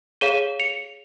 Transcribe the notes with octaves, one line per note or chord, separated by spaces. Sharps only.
G#4 C#5 F5 D#7 G7
C#7 F7